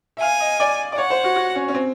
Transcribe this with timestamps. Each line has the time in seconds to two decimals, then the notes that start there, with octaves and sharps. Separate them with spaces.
0.17 E5
0.21 F5 G#5
0.40 D#5
0.60 D5
0.92 D5
0.98 C#5 F#5
1.10 C5
1.24 F#4
1.36 F#4
1.55 C#4
1.68 C#4
1.74 C4